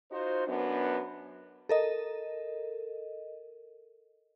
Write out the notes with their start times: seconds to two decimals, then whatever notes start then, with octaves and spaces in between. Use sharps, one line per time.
0.11 D#4 F4 F#4 C5
0.47 F#2 B3 D4
1.69 A4 A#4 D#5